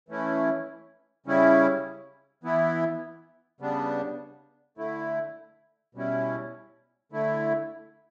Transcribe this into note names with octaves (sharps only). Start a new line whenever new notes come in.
E3 A3 C#4 E4
C#3 G3 C#4 E4
E3 B3 E4
C#3 G3 B3 D4
D3 A3 E4
B2 G3 C#4 E4
D3 A3 E4